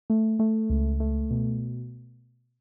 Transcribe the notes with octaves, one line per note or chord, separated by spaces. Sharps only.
A3
A3
C#2
A3
B2